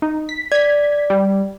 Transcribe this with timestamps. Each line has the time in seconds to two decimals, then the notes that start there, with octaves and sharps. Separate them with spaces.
0.02 D#4
0.29 B6
0.52 D5 G#6 B6
1.10 G3